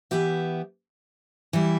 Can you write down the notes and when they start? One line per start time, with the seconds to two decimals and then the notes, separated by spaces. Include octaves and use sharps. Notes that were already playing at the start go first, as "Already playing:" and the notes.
0.11 E3 B3 G4 E5
1.53 E3 G3 E4